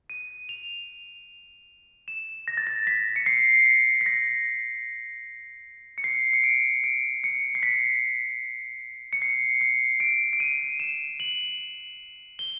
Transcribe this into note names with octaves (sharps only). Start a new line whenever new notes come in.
D#7
F7
E7
A#6
A6
A#6
B6
C#7
C7
B6
B6
A#6
C#7
C7
C#7
D7
D7
C#7
C7
B6
C#7
C7
C7
D7
D7
D#7
E7
F#7
G7